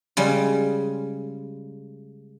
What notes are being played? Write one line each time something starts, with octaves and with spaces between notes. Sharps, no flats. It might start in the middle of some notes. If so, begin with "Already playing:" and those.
C#3 G3 G#3